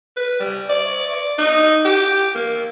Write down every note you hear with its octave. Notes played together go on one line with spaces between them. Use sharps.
B4
G3
D5
D#4
G4
A#3